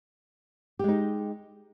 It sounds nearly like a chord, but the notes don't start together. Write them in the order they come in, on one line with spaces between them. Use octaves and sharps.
G4 G#3 D#4